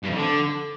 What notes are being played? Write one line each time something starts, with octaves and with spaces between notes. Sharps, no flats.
G2
F2
D3